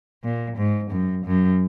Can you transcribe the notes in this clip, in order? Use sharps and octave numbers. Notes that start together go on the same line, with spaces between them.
A#2
G#2
F#2
F#2